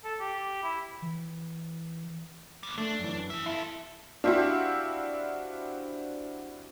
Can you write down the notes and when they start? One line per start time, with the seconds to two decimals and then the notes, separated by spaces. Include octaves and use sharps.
0.04 A4
0.20 G4
0.63 E4
1.02 E3
2.63 G3 B3
2.78 A3 D4
2.99 F#2 E3
3.30 G#4 E5
3.46 E4 F4 A4
4.24 C4 D4 E4 F#4 G4 F5